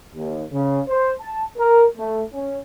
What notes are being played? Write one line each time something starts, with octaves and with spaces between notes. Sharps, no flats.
D#2
C#3
C5
A5
A#4
A3
C#4